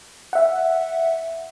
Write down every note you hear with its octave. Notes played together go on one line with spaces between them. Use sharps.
E5 F#5